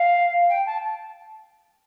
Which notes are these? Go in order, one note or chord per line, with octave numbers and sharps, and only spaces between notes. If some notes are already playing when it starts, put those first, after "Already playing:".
Already playing: F5
G5
A5